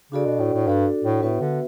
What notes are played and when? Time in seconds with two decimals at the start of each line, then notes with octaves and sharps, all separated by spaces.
0.12 C#3 D4 F#4 A4 D5
0.26 B2
0.39 A2
0.53 A2
0.67 G2 D4 F#4 A4 D5
1.04 A2
1.22 A2 B3 F#4 B4 E5
1.41 D3